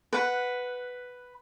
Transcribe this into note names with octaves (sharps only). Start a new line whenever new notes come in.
B4 F#5